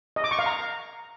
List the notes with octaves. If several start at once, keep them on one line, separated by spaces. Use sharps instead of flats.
D#5
D6
C#6
F5
A#5